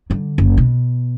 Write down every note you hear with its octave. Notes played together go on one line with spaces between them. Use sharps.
D3 G3
F#1
B2